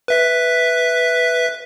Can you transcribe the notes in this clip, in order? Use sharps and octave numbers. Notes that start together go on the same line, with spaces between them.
B4 E5 B6